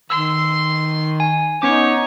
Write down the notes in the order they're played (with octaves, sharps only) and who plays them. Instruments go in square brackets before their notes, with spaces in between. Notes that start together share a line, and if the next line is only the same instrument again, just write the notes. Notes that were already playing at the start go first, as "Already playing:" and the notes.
[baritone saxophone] D#3 [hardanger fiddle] C6 [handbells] E6
[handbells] G#5
[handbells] B3 C#4 D6 [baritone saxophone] D#4 [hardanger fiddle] C#5